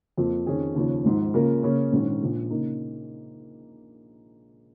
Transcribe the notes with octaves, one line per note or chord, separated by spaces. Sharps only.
F2 F3 A#3 F4
F2 D#3 C#4 G#4
D#2 C#3 F3 C#4
G#1 G#2 F3
C#3 A#3 F4 A#4
C#3 A#3 C#4
A#1 G#2 D#3 C#4
A#1 A#2 A#3
C#3 A#3 D#4